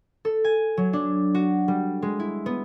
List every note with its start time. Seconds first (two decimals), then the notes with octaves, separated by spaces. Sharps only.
0.25 A4
0.44 G#5
0.77 F#3
0.93 D4
1.35 F#4
1.68 G3
2.02 G#3
2.20 E4
2.46 B3